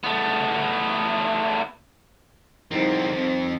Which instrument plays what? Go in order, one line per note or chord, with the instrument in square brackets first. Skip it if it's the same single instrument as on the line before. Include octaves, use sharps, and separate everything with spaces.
[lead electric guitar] A3 B3
[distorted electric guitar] E2 C4 [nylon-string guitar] D#3 F3 G3
[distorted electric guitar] F2